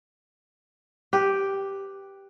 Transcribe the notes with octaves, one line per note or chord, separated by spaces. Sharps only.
G4 B4